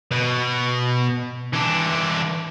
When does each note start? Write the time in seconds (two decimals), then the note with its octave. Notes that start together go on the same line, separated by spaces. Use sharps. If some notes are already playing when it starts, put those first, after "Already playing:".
0.11 B2
1.53 E3 D4